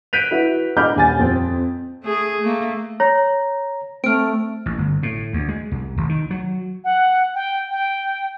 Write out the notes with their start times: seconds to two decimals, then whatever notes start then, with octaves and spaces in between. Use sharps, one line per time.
0.13 F#6 G6 B6 D7 D#7 F7
0.31 E4 F#4 B4
0.77 D#5 B5 D6 F6 G6
0.96 D#1 G#5 A6
1.19 F2 C4
2.03 A3 G#4
2.40 A3 A#3
3.00 C#5 A#5
4.04 A3 C4 F6 D7
4.66 A1
4.78 G1
5.03 A2
5.33 D2
5.48 G#3
5.72 C2
5.98 G#1
6.09 D#3
6.31 F#3
6.84 F#5
7.35 G5
7.71 G5